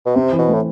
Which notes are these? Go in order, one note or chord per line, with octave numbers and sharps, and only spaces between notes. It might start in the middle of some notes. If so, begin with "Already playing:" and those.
B2
C3 C4
E3
B2
A2 A3